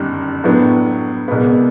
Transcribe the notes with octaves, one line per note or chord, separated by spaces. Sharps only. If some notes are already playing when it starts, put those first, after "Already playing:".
Already playing: G1 F#2 D#3 G3
A2 F#3 B3 D4
C2 B2 G#3 B3